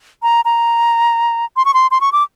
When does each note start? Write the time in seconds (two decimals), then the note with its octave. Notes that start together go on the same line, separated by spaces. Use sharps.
0.23 A#5
0.45 A#5
1.57 C6
1.65 C#6
1.74 C6
1.91 C6
2.01 C#6
2.12 D6